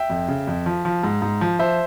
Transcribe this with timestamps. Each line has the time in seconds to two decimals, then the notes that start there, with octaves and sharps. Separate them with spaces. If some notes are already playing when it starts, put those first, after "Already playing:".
Already playing: E5 G5
0.10 F2
0.28 C#3
0.47 F2
0.66 F3
0.85 F3
1.03 G#2
1.22 G#2
1.41 F3
1.59 F3 C5 E5